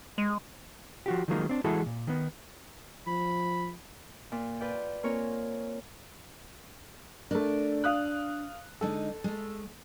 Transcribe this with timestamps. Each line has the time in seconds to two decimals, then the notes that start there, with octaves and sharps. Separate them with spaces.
0.18 G#3
1.06 F3 F#4 G4
1.28 D#3 F3 F#3 G#3 A#3 D#4
1.49 C4 D4
1.64 E3 G#3 E4 F#4 G#4 A4
1.86 A#2
2.07 D#3 B3
3.07 F3 B5
4.32 A#2
4.60 F4 B4 D5 G5
5.03 A#3 C4 F4 A#4 C#5 G#5
7.31 A3 D4 A#4 D5
7.84 F5 D#6 F#6
8.81 D3 G#3 D#4 A4
9.24 G#3 A3